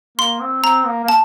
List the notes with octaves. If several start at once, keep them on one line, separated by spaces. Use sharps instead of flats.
A#3 C6
C4
C4 A#5
A#3
A#3
A5